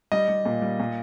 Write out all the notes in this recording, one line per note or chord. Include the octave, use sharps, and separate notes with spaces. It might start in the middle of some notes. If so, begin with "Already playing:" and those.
G3 D#5
G3
A#2
G3
A#2